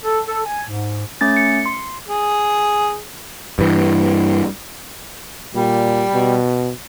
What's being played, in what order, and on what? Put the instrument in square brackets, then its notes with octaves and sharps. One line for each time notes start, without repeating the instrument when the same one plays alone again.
[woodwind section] A4
A4
G#5
G#2
[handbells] A3 C#4 A6
C#7
C6
[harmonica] G#4
[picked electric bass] G2 E3
[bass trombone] A#2 [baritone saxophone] G3
[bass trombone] B2